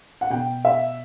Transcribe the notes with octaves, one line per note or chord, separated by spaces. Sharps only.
F#5
B2 G5
E5